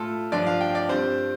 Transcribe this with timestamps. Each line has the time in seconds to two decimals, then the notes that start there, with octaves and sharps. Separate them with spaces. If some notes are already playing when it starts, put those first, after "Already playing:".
Already playing: A2 A3 F4 A4
0.32 G2 F3 D4 F4 D5
0.46 F5
0.61 G5
0.75 D5
0.89 G2 G3 C4 C5